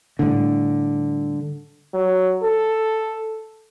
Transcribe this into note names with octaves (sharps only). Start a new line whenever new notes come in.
A2 D3 G3
F#3
A4